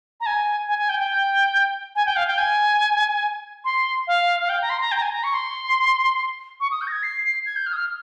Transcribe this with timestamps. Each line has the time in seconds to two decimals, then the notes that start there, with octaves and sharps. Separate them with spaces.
0.20 A#5
0.26 G#5
0.68 G#5
0.79 G#5
0.89 G5
1.00 G5
1.96 G#5
2.06 G5
2.16 F5
2.27 G5
2.38 G#5
3.65 C6
4.07 F5
4.41 F5
4.49 G5
4.62 A#5
4.70 C6
4.81 A#5
4.92 G5
4.97 A#5
5.02 G#5
5.13 A#5
5.24 C#6
5.34 C6
6.60 C#6
6.71 D#6
6.81 G6
6.87 A#6
6.92 G#6
7.03 C7
7.24 C7
7.46 G#6
7.56 G6
7.66 F6
7.73 D#6
7.77 F6